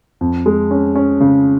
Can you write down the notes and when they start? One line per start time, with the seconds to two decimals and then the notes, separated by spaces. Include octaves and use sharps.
0.21 F2
0.46 G#3
0.71 C#4
0.96 C#4
1.21 C#3